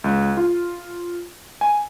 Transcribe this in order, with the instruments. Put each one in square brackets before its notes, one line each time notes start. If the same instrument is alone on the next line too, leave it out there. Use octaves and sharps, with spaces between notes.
[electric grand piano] C#2
F4
G#5